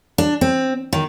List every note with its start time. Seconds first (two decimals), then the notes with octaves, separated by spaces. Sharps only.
0.18 D4
0.41 C4
0.93 D#3